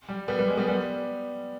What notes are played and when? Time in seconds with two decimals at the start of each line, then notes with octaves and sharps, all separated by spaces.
0.09 G3
0.28 G3 B3
0.38 G3 B3
0.48 G#3
0.57 G3 B3
0.68 G3 B3